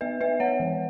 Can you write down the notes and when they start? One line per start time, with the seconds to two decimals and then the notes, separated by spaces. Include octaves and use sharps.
0.01 B3 B4 E5
0.21 B3 B4 E5
0.40 B3 C#5 F#5
0.60 E3